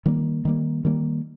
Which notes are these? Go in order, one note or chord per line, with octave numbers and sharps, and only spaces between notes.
D#3 G3 A#3
D#3 G3 A#3
D#3 G3 A#3